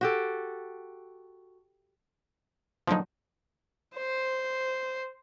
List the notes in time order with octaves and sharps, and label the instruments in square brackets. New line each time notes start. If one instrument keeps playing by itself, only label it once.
[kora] F#4 G4 A4
[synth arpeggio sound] A#2 D3 F#3 [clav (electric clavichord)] F3 D#4
[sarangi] C5